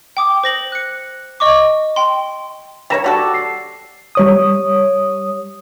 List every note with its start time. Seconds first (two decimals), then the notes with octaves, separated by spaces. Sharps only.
0.17 G5 D6 D#6
0.44 C5 A#6 F#7
0.72 F#6 C#7
1.40 D#5 C#6 D6
1.96 G5 C6
2.90 G3 A#4 C#5 G5 A#6 E7
3.04 G3 F#4 A4
3.18 D6
3.34 C7
4.15 G3 C#5 D#6